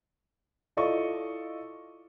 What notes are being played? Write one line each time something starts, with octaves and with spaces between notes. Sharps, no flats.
E4 F4 A4 D5 D#5 C#6